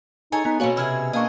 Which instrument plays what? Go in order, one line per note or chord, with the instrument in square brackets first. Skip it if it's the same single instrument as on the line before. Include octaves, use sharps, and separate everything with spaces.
[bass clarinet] D#4 [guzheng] G#4 A4 C#5 [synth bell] G#5
[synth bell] B3 [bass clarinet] D#4
[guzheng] B2 C4 C#4 [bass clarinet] A#3 [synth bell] F#4 C#5
[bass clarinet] C3 [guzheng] E4 G#4 [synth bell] E6 F6
[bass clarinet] A#3 [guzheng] C4 D4 G#4 [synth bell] D#5 C#6